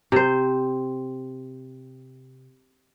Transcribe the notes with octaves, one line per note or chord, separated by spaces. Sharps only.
C3 C5